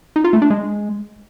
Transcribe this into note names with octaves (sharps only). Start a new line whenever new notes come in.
D#4
F4
A3
D4
G#3